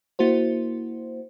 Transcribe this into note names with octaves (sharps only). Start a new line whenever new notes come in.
A#3 E4 F#4 C5